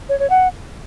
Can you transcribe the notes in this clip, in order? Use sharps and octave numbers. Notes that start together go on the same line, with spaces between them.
C#5
C#5
F#5